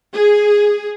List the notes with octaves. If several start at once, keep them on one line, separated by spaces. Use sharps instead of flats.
G#4